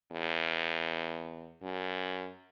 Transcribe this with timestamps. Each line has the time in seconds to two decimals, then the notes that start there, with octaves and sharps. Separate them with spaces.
0.12 E2
1.62 F#2